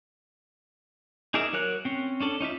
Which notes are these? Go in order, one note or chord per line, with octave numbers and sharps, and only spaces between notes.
D#4 G#4 A#4 D5 E5
F#3 A#4 C#5 F#6
C4 C#4
C#4 D4 A4
C#4 D#4 F4 E5